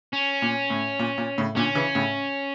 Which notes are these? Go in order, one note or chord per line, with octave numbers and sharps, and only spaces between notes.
C#4
A#2
A2
A#2
A#2
A2 C#3
A#2 D3 C#4
C#3 E3
A2 C#3